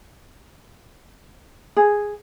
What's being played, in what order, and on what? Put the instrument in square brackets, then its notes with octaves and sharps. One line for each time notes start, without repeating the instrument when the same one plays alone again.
[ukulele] G#4